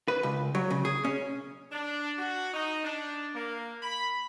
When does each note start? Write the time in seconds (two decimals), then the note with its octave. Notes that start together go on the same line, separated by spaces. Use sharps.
0.08 B4
0.23 C#2
0.55 F#3
0.70 C#3
0.85 G#4
1.05 C#4
1.72 D4
2.18 F#4
2.54 D#4
2.84 D4
3.34 A#3
3.83 B5